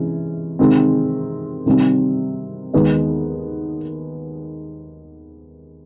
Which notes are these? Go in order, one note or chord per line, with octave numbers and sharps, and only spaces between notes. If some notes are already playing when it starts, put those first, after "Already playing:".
Already playing: C3 E3 G#3 C#4
C3 D#3 G#3 C4
C3 D#3 G3 C4
D#2 D#3 G#3 B3 D#4